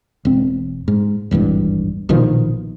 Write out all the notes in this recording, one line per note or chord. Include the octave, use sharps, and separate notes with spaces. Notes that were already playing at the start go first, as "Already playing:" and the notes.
E1 C4
G#2
D#1 G#1 E2 G2
A#1 B2 D#3 F3